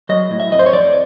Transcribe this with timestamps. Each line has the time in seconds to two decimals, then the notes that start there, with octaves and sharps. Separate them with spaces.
0.09 F#3 D#5
0.31 A2
0.40 E5
0.52 F2 D#5
0.59 C5
0.66 C#5
0.73 F2 D5